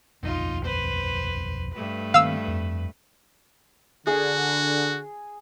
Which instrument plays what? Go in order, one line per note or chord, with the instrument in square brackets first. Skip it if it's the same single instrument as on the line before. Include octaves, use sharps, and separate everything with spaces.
[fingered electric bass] D#1 B1 F2 [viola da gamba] D#4 F4
[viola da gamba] B4 C5
G2 A3 B4
[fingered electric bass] D#3 A#3 C4 [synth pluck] F5 E6
[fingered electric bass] F2
[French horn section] D3 [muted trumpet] F#4 [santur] G#4